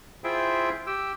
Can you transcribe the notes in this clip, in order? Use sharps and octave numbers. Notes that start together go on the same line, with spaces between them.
E4 F4 G#4 C5 E5 G5
G4 G5 E6